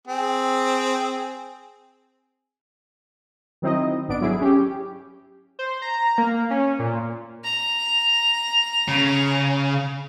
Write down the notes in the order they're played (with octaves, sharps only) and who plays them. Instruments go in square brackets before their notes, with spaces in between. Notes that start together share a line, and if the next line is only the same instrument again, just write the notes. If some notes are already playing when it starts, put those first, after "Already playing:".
[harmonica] C4 G#4
[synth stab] D#3 F#3 C4 D#4 E4 D#5
G#1 B3 D4 D7
F#3 E4 G#4
C#4 G4
[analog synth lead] C5
A#5
A#3
C#4
A#2
[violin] A#5
[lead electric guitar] C#3